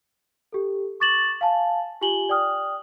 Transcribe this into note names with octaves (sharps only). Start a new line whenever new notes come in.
G4 A4
C#6 D6 A6 E7 F#7
F5 G#5 A5
F4 G4 G#5 F#7 G7
D5 G5 D#6 F6